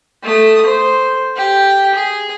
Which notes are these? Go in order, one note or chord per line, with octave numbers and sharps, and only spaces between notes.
A3 D#6
C5
G4
G#4